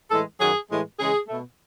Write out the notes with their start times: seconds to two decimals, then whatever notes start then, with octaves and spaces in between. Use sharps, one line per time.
0.11 A2 E3 G#3 A4
0.40 F#2 D#3 F#3 G#4
0.70 A2 E3 G#3
0.99 C#3 E3 G#3 G#4
1.28 B2 A3